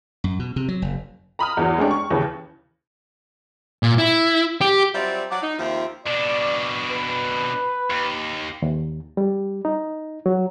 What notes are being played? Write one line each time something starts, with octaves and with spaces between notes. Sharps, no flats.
F#2
B2
C3
F#3
F#1
A#5 B5 D#6 F6
E2 E3 F#3
G#3 A3 C#4 D4 G4
C#6
D#2 C#3 E3
A#2
E4
G4
F#3 G3 C4 F4 D5 E5
F#3 D5 F#5
D#4
D#2 F3 C4 F4 E5
B2 D4 D5
B4
D#2
D#2
G3
D#4
F#3